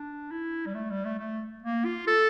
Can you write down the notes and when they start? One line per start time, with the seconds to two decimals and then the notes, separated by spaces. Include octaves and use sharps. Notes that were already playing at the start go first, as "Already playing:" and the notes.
Already playing: D4
0.31 E4
0.66 G3
0.75 A3
0.91 G3
1.05 A3
1.19 A3
1.63 A#3
1.85 F4
2.07 A4